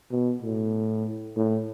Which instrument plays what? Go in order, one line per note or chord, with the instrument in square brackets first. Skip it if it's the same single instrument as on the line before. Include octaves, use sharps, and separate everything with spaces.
[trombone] B2
A2
A2